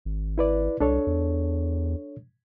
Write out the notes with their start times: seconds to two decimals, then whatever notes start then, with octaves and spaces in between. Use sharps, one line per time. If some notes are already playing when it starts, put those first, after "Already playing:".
0.05 G#1
0.38 E4 B4 D5
0.80 C2 D4 A4 C#5
1.07 E2